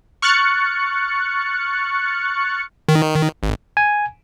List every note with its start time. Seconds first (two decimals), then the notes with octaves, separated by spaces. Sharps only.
0.22 C#6 F6 F#6 A6 C#7
2.89 D#3
3.43 G#1
3.77 G#5